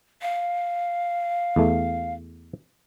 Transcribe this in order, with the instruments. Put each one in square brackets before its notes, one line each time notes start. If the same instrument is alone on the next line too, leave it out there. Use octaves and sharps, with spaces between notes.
[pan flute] F5
[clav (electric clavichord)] E2 A3